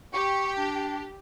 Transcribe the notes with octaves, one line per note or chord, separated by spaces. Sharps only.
G4 C#6
D4